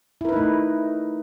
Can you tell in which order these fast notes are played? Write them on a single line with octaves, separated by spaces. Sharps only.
E4 A#4 B4 D#4 A3